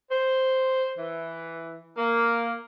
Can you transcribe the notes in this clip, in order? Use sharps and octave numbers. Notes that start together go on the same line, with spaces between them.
C5
E3
A#3